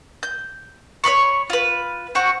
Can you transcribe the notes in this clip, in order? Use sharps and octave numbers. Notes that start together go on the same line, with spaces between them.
G6
C#5 D5 B5 C#6
F4 B4
C4 F#4 C#6